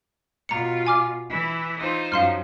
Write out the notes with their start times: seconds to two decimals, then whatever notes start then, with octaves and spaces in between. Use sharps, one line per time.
0.49 B2 F4 A#5 C#7
0.86 G#5 D6 F6
1.30 E3 E4
1.77 D#4 F4 C5
2.12 F#2 F3 F5 C6 F6